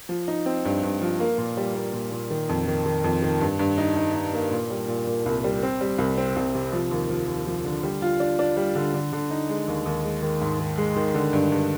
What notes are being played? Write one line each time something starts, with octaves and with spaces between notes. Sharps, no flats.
F3
D#4
C4
G2
G2
F3
A#3
A#2
G3
A#3
A#2
A#2
D#3
F2
D#3
D#3
F2
D#3
G2
G2
D#4
D#4
D#4
A#3
A#2
G3
A#2
A#2
C2
G3
C4
G3
C2
C4
C2
C3
F3
D#2
F3
D#2
F3
D3
G3
F4
D4
D4
G3
D3
D3
D3
D#4
G#3
D#2
D#2
G#3
D#3
G#2
D#3
G#3
D#3
D3
G2
G2